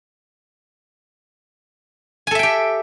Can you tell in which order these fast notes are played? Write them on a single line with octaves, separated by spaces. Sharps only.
G#5 A4 E5 G5 G4